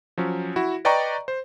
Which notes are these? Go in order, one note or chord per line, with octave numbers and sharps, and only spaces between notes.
F3 F#3 C#4
E4 F#4
B4 D5 D#5 G5 A#5 C#6
C5